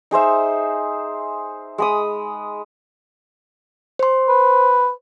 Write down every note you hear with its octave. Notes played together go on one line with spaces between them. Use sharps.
D#4 G#4 C5 E5
G#3 B5 D#6
C5 C6
B4